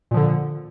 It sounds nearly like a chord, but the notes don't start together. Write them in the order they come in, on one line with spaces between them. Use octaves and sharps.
A#2 F3 D3